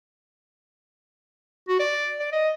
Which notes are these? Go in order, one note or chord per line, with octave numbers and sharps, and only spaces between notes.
F#4
D5
D5
D#5